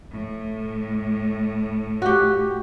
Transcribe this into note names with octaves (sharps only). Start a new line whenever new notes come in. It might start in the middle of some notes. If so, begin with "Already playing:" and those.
A2
F#4 G4